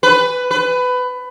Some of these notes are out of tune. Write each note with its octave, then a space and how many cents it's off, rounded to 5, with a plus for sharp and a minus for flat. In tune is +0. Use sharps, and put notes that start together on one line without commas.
B4 +15
B4 +20